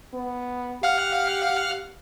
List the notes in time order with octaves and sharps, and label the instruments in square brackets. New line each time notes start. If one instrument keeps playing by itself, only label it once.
[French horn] B3
[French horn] G4 [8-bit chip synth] F5 F#5 F6